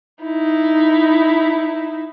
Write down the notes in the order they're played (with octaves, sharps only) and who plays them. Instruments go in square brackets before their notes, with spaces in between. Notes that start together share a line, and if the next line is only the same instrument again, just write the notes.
[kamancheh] D#4 E4